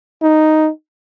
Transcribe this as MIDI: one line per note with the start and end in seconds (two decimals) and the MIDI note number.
0.22 0.70 63